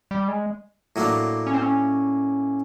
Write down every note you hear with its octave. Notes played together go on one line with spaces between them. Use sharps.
G3
G#3
A2 F#3 A#3 D4
C#4
C4
C#4